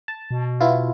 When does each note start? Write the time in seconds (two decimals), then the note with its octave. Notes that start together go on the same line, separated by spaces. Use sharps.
0.08 A5
0.31 B2
0.61 B3 E4 F4